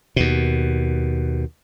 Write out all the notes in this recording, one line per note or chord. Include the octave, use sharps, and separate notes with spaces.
D#2 B2